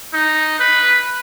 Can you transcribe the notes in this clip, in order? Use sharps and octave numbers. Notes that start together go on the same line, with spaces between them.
D#4
B4